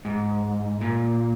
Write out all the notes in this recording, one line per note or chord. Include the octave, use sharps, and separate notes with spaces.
G#2
A#2